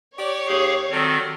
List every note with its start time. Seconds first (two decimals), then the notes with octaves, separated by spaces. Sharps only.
0.18 G4 C#5 D5
0.47 D#2 G4 G#4 F5
0.90 D#3 F#3 G3 C4 A4